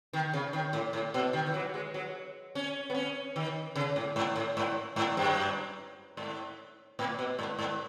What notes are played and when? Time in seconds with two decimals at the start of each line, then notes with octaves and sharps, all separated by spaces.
0.13 D#3
0.33 C#3
0.53 D#3
0.73 A2
0.93 A2
1.14 B2
1.33 D#3
1.46 E3
1.54 F#3
1.74 G#3
1.94 F#3
2.55 C#4
2.90 B3
2.94 C#4
3.36 D#3
3.76 C#3
3.96 A2
4.16 G#2
4.36 A2
4.57 G#2
4.96 G#2
5.17 F#2
6.17 G#2
6.99 A2
7.19 B2
7.39 G#2
7.59 G#2